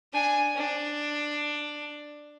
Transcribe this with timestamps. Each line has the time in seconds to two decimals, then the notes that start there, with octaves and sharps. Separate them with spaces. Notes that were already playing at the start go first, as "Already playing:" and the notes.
0.13 D4 G#5
0.55 D4